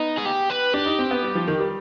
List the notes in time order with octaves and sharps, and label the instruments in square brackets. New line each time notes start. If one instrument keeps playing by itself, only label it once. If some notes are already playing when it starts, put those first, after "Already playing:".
Already playing: [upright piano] B3 [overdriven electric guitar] D#4
[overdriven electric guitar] G#4
G4
B4
[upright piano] D4 [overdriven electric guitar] G4
[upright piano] D#4
C4
B3
G3
F3
D#3
G3